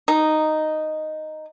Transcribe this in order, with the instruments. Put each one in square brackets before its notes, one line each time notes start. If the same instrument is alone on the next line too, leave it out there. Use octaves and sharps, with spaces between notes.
[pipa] D#4